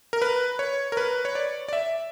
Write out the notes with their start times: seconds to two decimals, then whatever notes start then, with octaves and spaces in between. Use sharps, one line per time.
0.13 A#4
0.22 B4
0.59 C#5
0.92 A#4
0.97 B4
1.25 C#5
1.35 D5
1.69 D5
1.73 E5